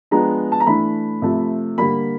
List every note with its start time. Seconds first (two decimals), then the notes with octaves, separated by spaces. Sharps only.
0.11 F3 G#3 B3 D4 A#5
0.52 A5
0.60 A#5
0.67 E3 A3 D4 B5
1.22 C3 F3 A3
1.78 D3 G3 A#3 B5